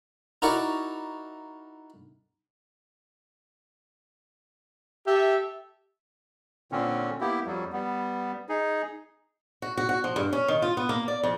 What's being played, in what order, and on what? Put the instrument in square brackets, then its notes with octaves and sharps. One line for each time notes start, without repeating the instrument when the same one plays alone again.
[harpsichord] D#4 E4 F#4 A#4 D5 C#6
[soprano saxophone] G4 [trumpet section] A4 E5
[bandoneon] A#2 D3 C4 C#4
A#3 B3 E4 G4
F2 F#3 G3
G3 B3
D#4 G#4
[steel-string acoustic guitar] F#4
F#4
F#4
F3
G2
C#4
D#3
F4
B3
A#3
D5
F2